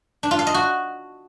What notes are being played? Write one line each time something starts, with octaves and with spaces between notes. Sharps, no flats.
D4
F4
F5
D#5
F#4